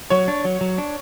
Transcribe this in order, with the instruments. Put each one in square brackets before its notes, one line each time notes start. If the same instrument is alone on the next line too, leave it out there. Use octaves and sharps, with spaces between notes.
[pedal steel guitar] F#3 [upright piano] C#5
[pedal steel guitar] D4
F#3
F#3
D4